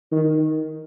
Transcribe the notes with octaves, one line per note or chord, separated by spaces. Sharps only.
D#3